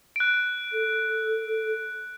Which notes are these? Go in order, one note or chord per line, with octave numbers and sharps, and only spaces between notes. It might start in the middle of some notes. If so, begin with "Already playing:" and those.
F#6 D7
A4